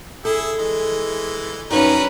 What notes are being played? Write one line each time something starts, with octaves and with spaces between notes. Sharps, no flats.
E4 G#4 A4
E3 G#3
G2 F#3 C#4 D#4 A#4 B4